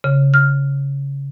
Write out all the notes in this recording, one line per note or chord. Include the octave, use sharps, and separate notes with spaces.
C#3
F6